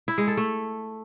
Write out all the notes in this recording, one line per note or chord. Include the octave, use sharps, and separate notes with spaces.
E4
G#3
A4
A3